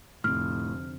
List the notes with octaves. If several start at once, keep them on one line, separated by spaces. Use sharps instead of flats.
F1 A2 D3 C4 F6